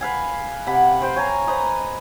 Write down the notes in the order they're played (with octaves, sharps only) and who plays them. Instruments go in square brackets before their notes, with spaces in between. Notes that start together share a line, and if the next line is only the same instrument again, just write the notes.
[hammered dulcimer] B4 F5 G#5
C3 F#5 B5
B4 C5 G5 C6
C#5 G#5 A#5
B4 C5 D#5 A#5